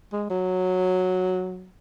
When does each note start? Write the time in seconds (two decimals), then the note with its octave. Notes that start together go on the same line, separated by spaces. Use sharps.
0.12 G#3
0.30 F#3